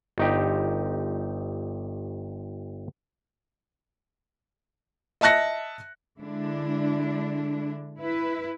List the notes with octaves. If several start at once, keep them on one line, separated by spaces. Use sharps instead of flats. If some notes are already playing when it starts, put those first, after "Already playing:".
G1 D#4 G4
D#5 E5 A5 F#6 A#6 C#7
D3 G#3 D4 E4
E4 B4